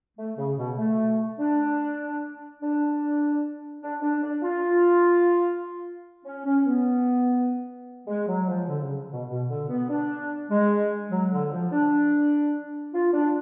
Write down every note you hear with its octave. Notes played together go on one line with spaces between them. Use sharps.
A3
C#3
B2
A3
D4
D4
D4
D4
D4
F4
C#4
C#4
B3
G#3
F#3
F3
D3
C#3
B2
B2
D3
B3
D4
G#3
F#3
D3
F3
D4
F4
D4